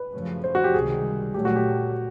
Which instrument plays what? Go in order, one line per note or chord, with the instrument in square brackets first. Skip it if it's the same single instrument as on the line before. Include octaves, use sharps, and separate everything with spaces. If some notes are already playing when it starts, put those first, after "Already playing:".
Already playing: [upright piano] B4
[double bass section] F#2 C#3 F3 A3 C#4
[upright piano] C5
F#4
G4
[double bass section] C#2 C3 D#3 G3 [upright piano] G#4
[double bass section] A#2 F#3 A3 [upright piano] G4
[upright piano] F#4
G4